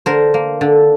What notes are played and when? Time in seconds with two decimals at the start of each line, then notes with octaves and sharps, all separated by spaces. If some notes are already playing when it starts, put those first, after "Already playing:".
0.06 D3 A#4 C5
0.34 A#3
0.61 D3